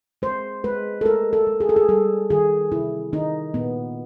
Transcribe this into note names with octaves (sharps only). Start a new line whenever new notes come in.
G#3 C5
G#3 B4
A4
G#3 A#4
A4
G#3
G#4
A4
G#4
G3 A4
D#3 G#4
C3 E4
D#3 D#4
A#2 B3